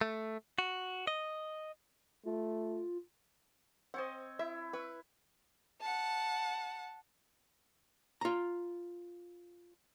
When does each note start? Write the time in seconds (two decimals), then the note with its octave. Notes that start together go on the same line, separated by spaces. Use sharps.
0.01 A3
0.59 F#4
1.07 D#5
2.25 A3 F4
3.94 C4 C5 C#5 D#5 F#5
4.39 E4 E5
4.73 B4 C#6
5.81 F#5 A5
8.21 F4 A#5